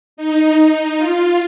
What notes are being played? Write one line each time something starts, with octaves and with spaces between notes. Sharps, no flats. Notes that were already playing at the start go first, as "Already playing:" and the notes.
D#4
F4